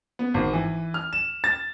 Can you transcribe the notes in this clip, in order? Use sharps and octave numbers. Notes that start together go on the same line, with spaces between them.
B3
G#1
E3
F6
E7
A6